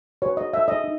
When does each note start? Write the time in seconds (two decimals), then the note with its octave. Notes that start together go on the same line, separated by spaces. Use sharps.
0.22 F#4 B4 C#5
0.37 D#5
0.53 E5
0.68 D#5
0.84 D#4